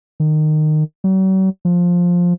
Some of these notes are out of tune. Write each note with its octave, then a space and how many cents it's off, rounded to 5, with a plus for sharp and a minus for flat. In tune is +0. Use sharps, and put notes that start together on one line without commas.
D#3 -20
F#3 +45
F3 +10